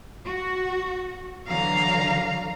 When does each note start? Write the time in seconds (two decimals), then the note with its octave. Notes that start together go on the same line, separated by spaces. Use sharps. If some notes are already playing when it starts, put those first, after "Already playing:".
0.24 F#4
1.48 D3 E3 F#3 F5 A#5